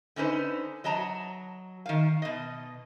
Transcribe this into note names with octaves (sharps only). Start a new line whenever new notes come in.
D3 C#4 D#4 B4 C5
F#3 D#5 A5 A#5
D#3 F5
B2 D#5